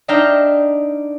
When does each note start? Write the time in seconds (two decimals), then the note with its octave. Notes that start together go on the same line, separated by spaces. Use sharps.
0.08 D4 D#4 E5 F5 G5 A#5